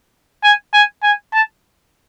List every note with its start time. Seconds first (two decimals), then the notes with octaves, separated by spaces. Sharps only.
0.44 G#5
0.74 G#5
1.03 G#5
1.33 A5